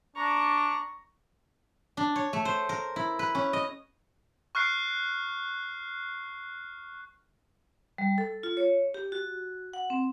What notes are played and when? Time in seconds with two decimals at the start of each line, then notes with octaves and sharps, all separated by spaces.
0.16 D4 A#5 C#6
1.97 D4
2.16 C#5
2.33 A3
2.45 C5
2.69 A#4
2.96 E4
3.19 B4
3.35 C#4
3.53 D#5
4.55 C#6 F6 F#6 C7
7.98 G3
8.18 A4
8.43 F4
8.57 C#5
8.94 G4
9.12 F#4
9.73 F#5
9.90 C4